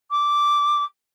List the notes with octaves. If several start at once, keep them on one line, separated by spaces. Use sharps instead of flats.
D6